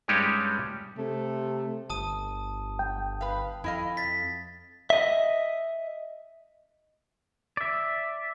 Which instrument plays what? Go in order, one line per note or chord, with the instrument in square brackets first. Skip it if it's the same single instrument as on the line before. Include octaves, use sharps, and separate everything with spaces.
[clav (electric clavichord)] G2 G3 G#3 C#4 D#4 G4
[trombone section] C3 [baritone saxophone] A3
[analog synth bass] G1 [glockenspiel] A5 D#6 D#7
[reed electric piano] G5
[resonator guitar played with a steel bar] B4 F5
[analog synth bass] F2 [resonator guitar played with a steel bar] E4 D#5 F5
[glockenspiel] A6 B6
[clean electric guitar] D#5 E5
[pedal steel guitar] D5 E5